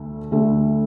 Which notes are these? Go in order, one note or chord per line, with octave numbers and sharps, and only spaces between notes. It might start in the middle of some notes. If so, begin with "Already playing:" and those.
Already playing: D2 D3 A3
D2 D3 A3